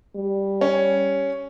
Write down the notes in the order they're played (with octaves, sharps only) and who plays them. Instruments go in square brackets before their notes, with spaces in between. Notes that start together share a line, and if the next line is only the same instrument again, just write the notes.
[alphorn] G3
[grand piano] C#4